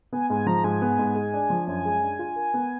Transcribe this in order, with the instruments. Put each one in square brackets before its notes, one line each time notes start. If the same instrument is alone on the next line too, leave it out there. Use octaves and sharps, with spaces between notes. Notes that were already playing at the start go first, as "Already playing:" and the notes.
[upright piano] B3 [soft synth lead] G#5
[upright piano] G#2 [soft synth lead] G#5
[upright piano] F3 [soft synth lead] A#5
[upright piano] G#2 [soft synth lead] G#5
[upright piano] B3
G#2
G#3
D4
F3
[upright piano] F#2 [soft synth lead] G#5
[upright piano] G#3
D4
F4
A#4
B3